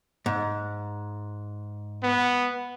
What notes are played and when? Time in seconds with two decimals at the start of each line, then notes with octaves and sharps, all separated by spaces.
0.26 G#2
2.03 B3